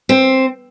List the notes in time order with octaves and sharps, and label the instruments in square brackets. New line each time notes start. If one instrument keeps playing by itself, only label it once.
[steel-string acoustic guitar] C4